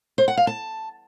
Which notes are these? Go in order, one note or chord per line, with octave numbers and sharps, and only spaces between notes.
C5
F#5
F5
A5